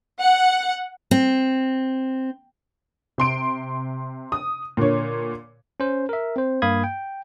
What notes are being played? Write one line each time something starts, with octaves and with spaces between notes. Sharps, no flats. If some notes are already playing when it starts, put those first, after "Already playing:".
F#5
C4
C3 C6 D7
D#6
A#2 D3 C#5
C#4 C5
A#4 E5
C4 C5
G2 A#3 F5 B5 D#6 G#6
G5